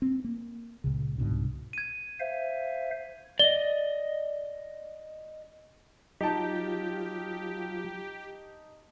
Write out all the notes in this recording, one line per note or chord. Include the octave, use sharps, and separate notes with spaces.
C4
A#3
C#2 A#2 C#3
C2 G#2 B2 D3
G#6 D#7
C5 E5 F5
D5 D#5 G7
F#3 D#4 F4 G4 A5